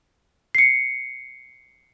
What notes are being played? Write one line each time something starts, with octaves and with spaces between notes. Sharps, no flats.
C7 C#7